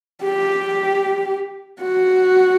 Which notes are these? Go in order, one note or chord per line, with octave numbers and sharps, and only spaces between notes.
G4
F#4